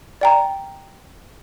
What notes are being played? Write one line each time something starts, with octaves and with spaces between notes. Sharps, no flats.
D5 G5 A#5